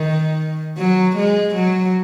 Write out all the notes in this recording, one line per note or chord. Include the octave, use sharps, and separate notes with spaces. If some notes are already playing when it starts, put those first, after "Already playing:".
Already playing: D#3
F#3
G#3
F#3